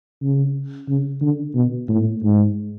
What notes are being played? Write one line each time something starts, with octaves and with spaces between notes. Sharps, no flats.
C#3
C#3
D3
B2
A2
G#2